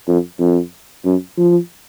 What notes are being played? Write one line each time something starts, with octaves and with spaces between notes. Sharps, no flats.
F2
F2
F#2
F3